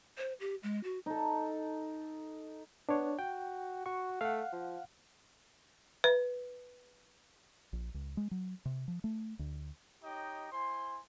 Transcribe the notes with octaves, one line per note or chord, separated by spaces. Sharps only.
C5
G4
G#3
F#4
D#4 A4
B3 D4 C#5
F#4 G5
F#4 C#6
A3 F5 F#5
F3
B4
A#1
C#2
G#3
F#3
C3
F3
A3
D2
D#4 G4 C#5 D#5 G5 A#5
E4 C5 G#5 C6